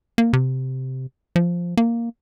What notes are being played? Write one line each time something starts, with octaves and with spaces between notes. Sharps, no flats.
A#3
C3
F3
A#3